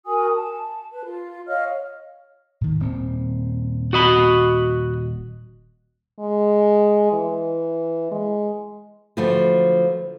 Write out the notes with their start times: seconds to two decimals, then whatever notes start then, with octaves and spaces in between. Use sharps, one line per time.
0.05 F#4 A#4 G#5 D#6
0.34 A5
0.90 B4
1.04 F4
1.47 C#5 D#5 F5 F6
2.61 A2 D#3
2.80 D#1 C4
3.93 F#4 D#5 B5
6.20 G#3
7.13 E3
8.12 G#3
9.17 D3 F3 F#3 A3 B3